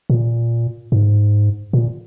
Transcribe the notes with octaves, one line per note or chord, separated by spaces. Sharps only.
A#2
G#2
A#2